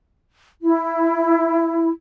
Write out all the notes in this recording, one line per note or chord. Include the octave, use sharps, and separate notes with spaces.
E4